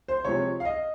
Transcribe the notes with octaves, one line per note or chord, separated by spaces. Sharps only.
C5
C3 F3 G#3 C#5
F5
D#5